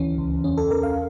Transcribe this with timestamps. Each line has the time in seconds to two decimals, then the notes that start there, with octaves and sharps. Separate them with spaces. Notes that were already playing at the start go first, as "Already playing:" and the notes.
Already playing: D2 E3 C#4
0.18 C#2
0.44 E2 C#4
0.58 A4
0.70 E2 A#4
0.83 F5